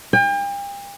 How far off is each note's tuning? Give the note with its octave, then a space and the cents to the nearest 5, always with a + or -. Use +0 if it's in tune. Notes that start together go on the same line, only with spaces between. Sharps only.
G5 +40